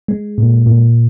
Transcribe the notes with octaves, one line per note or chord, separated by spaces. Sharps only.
G#3
A#2
A#2